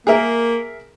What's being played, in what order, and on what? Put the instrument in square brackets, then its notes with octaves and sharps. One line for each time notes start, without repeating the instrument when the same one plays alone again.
[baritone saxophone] A#3 [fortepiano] G#4 A#4 E5